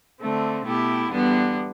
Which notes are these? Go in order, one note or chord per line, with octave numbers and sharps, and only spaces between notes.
D3 A3 C4
B2 A3 E4 G4
E2 D3 G3 B3